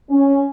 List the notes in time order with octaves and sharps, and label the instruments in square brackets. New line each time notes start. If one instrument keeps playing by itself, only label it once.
[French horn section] C#4